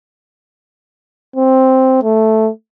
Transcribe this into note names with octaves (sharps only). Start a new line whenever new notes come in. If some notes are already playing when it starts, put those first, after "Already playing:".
C4
A3